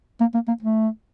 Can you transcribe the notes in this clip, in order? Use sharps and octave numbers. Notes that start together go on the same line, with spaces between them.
A#3
A#3
A#3
A3